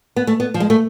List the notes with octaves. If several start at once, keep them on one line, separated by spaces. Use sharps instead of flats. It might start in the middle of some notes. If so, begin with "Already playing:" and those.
B3
A3
B3
F3
G#3
A3